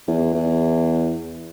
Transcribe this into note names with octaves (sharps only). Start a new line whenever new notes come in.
E2
E2